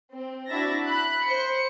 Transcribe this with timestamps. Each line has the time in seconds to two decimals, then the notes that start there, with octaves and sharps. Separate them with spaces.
0.13 C4
0.49 D4 E4 F#4 E5 A6 A#6
0.86 B5 F#6
1.24 C5 C#7